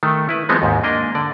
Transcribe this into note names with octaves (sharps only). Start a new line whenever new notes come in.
D#3 A3
E4 B4
E3 F3 G#3 B3 C4 D#4
D#2 G#2
A#3 D4 A#4 D#5
D3 D5